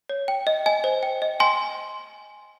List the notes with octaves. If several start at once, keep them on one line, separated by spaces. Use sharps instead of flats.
C#5
G5
D#5
D#5 G#5
C5
G5
D#5
G5 G#5 C6